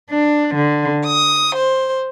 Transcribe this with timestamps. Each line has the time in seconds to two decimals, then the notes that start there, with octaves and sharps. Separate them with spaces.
0.11 D4
0.55 D3
1.05 D#6
1.55 C5